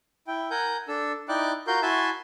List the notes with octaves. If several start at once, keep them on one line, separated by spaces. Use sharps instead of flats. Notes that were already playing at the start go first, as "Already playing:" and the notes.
E4 G5
A#4 F#5 G#5 G6
D4 A4 E6
D#4 E4 D5 G5 D6 F#6
F4 F#4 A#4 C6 G6
E4 F#4 E5 G#5 A5 C6